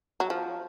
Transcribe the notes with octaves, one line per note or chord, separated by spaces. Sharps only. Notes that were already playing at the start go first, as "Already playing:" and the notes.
F#3
F3